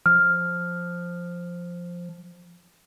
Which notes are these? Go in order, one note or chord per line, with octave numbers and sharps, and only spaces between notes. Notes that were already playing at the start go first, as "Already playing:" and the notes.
F3 F6